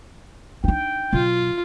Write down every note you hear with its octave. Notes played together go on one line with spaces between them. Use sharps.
D4 D#4 G5
B2 F#3 F4